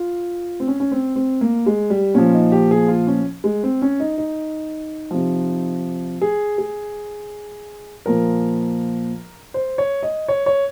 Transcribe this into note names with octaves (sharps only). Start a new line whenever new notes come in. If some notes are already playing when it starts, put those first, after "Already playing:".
Already playing: F4
C4
C#4
C#4
C4
C4
A#3
G#3
G3
A#2 F3 C#4
D#4
G4
G#4
F4
C#4
G#3
C4
C#4
D#4
D#4
C3 F3
G#4
G#4
A#2 F3 A#4
C5
C#5
D#5
C#5
C#5